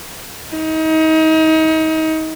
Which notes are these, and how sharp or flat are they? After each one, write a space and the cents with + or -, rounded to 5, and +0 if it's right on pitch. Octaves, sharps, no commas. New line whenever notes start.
D#4 +30